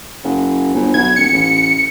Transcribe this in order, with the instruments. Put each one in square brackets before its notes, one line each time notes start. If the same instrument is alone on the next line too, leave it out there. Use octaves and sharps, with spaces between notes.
[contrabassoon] F#1
G1
[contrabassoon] B1 [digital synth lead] G#6
[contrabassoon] D#1 [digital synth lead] C#7
[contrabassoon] A1